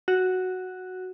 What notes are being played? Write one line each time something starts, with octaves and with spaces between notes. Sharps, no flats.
F#4